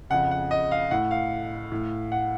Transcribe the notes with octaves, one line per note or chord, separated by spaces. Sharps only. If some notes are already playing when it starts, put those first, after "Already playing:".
F2 C#3 F#5
F#5
D#5
F5
A2 F#5
F5
A2
F#5